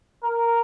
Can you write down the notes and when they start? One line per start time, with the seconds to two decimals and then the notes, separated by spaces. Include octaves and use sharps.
0.23 A#4